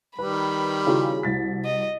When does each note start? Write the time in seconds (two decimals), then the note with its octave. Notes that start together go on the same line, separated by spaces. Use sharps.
0.19 D#3 G3 B4 B5
0.87 C#3 E4 F#4
1.23 C2 A6 B6
1.64 D#5